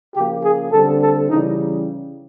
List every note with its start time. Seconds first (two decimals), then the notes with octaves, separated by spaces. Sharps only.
0.15 C#3 F3 A#3 G4
0.43 G#4
0.72 D3 G3 C4 A4
1.01 A4
1.30 C#3 E3 G3 D#4